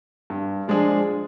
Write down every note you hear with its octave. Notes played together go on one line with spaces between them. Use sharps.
G2
F3 G#3 D4 G#4